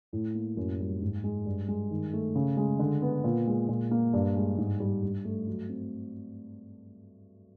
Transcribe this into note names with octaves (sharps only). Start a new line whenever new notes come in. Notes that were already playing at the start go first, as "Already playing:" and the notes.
A2
A#3
F#2
G3
G#2
G#3
G2
G#3
D#3
A3
C#3
G#3
D3
B3
A#2
G#3
A#2
A#3
G2
G#3
G#2
G3
G2
A3
F#3
C4